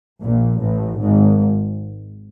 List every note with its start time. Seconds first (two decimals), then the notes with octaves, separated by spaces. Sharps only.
0.22 A#1 A#2
0.62 A1 A2
1.01 G#1 G#2